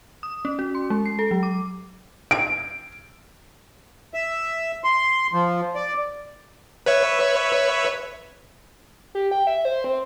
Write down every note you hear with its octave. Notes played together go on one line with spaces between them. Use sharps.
D#6
C#4
F#4
C6
G#3
C7
A4
F#3
D6
D7
E5
C6
F3
D5
B4 C#5 E5
G4
G5
E5
C5
C4